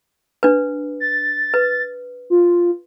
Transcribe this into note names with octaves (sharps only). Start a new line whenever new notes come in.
D4 B4
A6
B4
F4